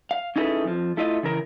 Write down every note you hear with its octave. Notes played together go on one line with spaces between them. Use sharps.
F5
C#4 D#4 E4 G#4 A4 B4
F2 F3
A3 E4 F4 D#5
C#3 E3 A#4